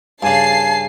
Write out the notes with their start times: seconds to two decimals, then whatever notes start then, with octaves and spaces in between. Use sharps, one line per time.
0.23 G2 C#3 G#5 A5 C7